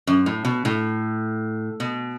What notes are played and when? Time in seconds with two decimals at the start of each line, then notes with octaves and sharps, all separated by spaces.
0.07 F#2
0.26 A2
0.45 B2
0.65 A2
1.80 B2